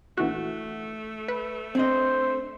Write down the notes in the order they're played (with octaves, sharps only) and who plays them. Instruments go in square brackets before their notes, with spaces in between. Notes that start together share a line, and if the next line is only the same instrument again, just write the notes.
[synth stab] A#1 E3 F#4 [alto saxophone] A3
[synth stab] B4
[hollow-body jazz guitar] C4 D4 D#5 [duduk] C5